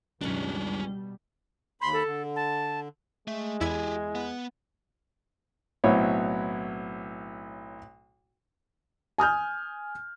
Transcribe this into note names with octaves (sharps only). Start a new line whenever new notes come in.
C#2 F#2 B2 D#3 G3 C#4 D4
D#2 B5 C6
A4
D3
A5
G#3 A3
E2 E4 G4 G#4 G#6
B3
B1 A2 B3 C4 E4 C#5
G#5 D#6 F6 G6